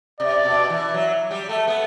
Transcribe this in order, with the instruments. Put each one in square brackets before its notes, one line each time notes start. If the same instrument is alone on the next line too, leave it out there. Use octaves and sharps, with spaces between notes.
[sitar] C3 [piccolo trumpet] D5
[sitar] B2
E3
F#3
G3
A3
B3